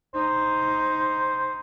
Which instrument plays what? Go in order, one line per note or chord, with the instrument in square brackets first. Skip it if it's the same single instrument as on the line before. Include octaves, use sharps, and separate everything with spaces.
[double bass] D#4 [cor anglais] C5